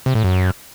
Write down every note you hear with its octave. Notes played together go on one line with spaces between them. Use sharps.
C3
A2
F#2